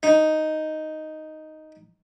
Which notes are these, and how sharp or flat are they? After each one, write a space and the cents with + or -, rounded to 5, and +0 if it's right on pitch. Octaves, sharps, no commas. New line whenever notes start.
D#4 +0